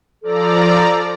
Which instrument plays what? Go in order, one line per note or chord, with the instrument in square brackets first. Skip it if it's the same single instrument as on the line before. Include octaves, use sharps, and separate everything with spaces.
[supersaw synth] F3 D5 A#5 [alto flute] A4